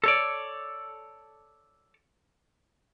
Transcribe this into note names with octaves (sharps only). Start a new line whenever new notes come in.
A4 C#5 D5